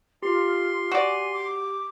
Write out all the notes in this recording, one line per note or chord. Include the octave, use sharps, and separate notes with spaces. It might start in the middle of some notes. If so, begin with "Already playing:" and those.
F4 G4 C6
F#4 D5 G#5
D6